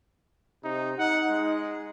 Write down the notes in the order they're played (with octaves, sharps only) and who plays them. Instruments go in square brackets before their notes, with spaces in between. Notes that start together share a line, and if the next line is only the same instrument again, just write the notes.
[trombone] C3 [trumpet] D#4
[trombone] D#4 [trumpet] F#5
[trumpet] G#3